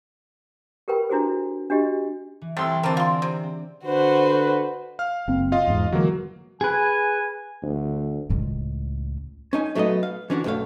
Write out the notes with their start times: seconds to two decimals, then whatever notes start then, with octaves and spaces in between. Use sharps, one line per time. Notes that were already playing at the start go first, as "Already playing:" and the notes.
0.88 G4 A#4 B4 G5 B5
1.09 D4 E4 F#4 G#4 C5
1.70 D4 F#4 G4 D#5
2.42 E3
2.57 C2 A3 C6 E6 A6
2.83 D3 E3 C4 G#4 A#4 D5 A5
2.97 F4 C6
3.22 C3
3.44 C4
3.85 D3 F#4 B4 C5
4.99 F5 F6
5.28 F#1 A#3 C4
5.52 F4 D#5 F5
5.67 E2 G#2
5.92 D3 E3 F#3 G#3 A#3
6.61 G#4 B4 G#5
7.62 D2
8.30 C#2 A2
9.53 C#4 D#4 G#5
9.75 F#3 A3 B3 B4 D#5
10.03 F5
10.30 E3 C#4 D4 F#4
10.44 B1 G2 A3 C#5 F5